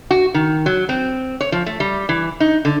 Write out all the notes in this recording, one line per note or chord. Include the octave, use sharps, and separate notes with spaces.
F#4
D#3
F#3
C4
C#5
F3
A3
G3
E3
D#4
D3